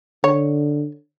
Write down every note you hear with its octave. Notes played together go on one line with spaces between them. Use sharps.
D3 C#5